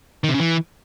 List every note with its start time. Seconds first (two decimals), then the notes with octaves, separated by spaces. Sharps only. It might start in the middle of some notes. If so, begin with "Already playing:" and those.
0.24 D#3
0.29 C3
0.34 C#3
0.40 E3